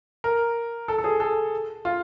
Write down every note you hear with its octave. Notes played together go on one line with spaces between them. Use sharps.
A#4
A4
A4
G#4
A4
F4